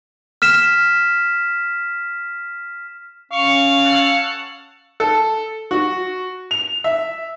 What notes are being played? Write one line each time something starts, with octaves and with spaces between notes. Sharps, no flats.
F6 B6 E7
C#4 F5 C#6
A4 C#5 F#5
A4
F#4
F7
E5